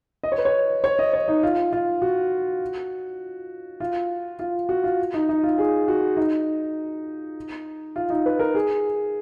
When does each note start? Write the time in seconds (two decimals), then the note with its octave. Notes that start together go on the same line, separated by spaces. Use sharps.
0.23 D#5
0.32 C#5
0.38 B4
0.45 C#5
0.84 C#5
0.99 D#5
1.13 C#5
1.28 D#4
1.43 F4
1.73 F4
2.02 F#4
3.80 F4
4.39 F4
4.69 F#4
4.84 F4
5.14 D#4
5.29 D#4
5.43 F4
5.58 G#4
5.88 F#4
6.17 D#4
7.96 F4
8.10 D#4
8.26 B4
8.39 A#4
8.55 G#4